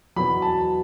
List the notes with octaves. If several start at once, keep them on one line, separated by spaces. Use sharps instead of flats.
E2 B2 F#3 B5
A5